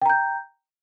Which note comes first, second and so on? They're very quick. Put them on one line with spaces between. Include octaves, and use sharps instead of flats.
G5 A#5 G6